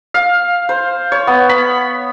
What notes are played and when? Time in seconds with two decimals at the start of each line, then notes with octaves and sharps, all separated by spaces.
0.14 F5
0.69 C5
1.12 C#5
1.27 B3
1.49 B5